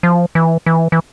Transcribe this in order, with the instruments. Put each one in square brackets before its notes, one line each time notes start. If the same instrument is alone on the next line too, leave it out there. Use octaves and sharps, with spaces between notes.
[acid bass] F3
E3
E3
E3